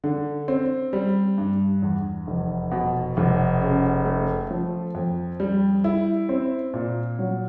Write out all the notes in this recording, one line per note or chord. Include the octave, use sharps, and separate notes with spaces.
D3
C4
G3
G2
E2
F1
B2
F1
C#3
A3
F3
F2
G3
E4
C4
A#2
F#3